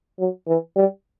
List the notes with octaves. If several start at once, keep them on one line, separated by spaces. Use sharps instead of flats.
F#3
E3
G3